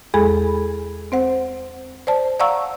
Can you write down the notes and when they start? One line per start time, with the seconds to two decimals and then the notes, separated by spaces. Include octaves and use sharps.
0.14 E2 G#3 G#4 A4 B5
1.12 C4 C5 F#5
2.07 C5 D5 A5
2.40 D5 F5 F#5 A#5 C#6 E6